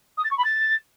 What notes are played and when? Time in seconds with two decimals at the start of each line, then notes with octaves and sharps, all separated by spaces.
0.17 D#6
0.24 A6
0.31 C#6
0.38 B5
0.44 A6